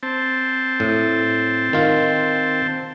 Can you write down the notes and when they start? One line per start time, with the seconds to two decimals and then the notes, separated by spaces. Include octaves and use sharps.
0.03 C4 A5
0.80 A2
1.73 D#3 F4